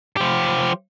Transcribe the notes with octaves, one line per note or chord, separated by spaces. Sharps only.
F3 G4